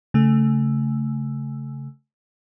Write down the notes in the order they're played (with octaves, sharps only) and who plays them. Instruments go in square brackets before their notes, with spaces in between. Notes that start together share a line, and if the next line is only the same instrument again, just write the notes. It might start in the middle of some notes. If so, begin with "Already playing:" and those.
[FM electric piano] C#3 A3